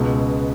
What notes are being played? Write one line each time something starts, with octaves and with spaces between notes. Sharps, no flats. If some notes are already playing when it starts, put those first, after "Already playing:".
Already playing: C#2 B2 G#3